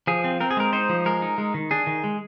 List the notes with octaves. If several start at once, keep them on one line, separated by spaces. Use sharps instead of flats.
F3 G#4
C4
C4 A#4
G#4
G#3 A#4
D#4 C5
F3
G#3 A#4
D#4
G#3
D#3
D4 G#4
D#3
G#3